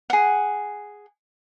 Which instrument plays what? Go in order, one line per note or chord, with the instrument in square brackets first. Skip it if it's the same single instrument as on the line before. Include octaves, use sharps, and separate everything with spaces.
[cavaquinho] G#4 F#5